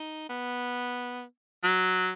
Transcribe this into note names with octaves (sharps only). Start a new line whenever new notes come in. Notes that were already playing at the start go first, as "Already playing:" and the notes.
Already playing: D#4
B3
F#3